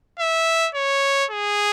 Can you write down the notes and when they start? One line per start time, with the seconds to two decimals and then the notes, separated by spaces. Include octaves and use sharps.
0.19 E5
0.75 C#5
1.30 G#4